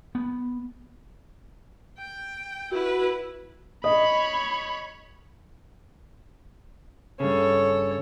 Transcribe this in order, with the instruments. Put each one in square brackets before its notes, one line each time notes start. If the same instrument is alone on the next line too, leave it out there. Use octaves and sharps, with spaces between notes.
[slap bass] B3
[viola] G5
[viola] E4 B4 [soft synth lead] F#4
[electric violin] C#5 B5 [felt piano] D#5
[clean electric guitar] G2 C#3 [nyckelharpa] A4 C#5